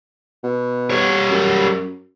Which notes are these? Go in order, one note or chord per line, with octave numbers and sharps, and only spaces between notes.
B2
G3 C#5
F#2